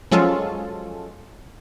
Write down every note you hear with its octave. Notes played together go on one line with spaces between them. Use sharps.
F3 F#3 G#3 C#4 F4 A4